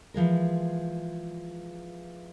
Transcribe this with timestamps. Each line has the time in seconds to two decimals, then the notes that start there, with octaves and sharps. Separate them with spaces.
0.14 E3 F3 G#3 A#4